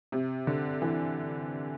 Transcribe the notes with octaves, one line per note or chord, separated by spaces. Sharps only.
C3
D3
E3